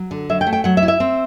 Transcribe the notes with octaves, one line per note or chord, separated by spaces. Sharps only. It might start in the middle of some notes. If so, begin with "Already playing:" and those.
Already playing: F#3
D3
F#3 E5
G5
A3
G5
F#3 F#5
E5
E4
E5
C4